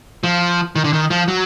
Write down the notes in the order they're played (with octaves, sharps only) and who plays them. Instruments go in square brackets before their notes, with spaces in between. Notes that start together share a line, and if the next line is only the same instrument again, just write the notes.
[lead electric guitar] F3
D#3
D3
D#3
F3
F#3